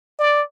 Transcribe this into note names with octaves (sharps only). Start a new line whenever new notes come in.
D5